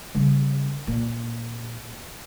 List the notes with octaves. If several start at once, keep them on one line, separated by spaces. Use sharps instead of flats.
C#3 G3
A#2